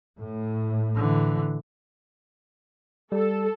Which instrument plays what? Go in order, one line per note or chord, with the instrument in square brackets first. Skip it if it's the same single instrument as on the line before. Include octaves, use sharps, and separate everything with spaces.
[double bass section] A2
[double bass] D3 E3
[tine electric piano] G3 [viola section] A4